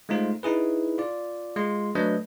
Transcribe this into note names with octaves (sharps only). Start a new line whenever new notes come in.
G#3 A3 D#4 F4 C5
D#4 E4 G#4 B4
F4 D5
G#3 F4 C6
F#3 A3 D4 B4 D#5 G6